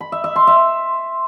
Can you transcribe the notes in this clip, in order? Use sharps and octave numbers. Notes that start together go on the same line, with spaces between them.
B5
E5
E5
C6
E5